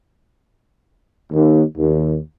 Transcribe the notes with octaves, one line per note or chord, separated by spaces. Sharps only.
D#2
D#2